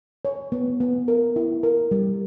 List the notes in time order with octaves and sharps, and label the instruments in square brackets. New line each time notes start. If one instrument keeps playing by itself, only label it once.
[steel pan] C#5
B3
B3
A#4
E4
A#4
G3